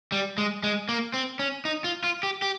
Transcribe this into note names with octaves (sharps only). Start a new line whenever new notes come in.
G3
G#3
G#3
A#3
C4
C#4
D#4
F4
F4
G4
G4